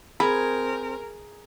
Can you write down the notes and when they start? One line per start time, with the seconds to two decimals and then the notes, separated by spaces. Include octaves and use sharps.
0.20 C4 G#4 A#4 B5